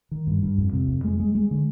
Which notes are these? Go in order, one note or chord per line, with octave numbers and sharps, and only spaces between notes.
D#3
G2
G2
F2
C3
F2
G#3
G#3
G#3
D3